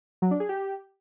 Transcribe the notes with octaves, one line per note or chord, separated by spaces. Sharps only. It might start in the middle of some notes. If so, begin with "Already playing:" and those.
F#3
D4
G#4
G4